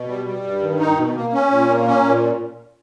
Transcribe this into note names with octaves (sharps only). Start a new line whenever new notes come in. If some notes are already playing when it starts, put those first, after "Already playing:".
Already playing: B2
G3
G3
G2
D#3
D#4
B2
A#3
C#4
A#2
A#3
C#4
A#2